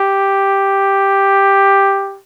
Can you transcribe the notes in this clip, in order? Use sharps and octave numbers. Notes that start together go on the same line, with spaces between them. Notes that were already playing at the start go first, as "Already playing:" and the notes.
Already playing: G4